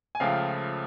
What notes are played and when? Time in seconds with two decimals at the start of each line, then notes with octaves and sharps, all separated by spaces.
0.15 G#5
0.20 C#2 C#3 F3 A3 F5 G5